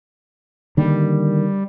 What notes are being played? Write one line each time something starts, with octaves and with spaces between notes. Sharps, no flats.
D3 D#3 G3 A#3